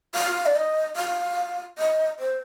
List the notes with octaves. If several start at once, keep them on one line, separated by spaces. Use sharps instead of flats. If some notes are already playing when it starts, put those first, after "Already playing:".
F5
D5
D#5
F5
D#5
C5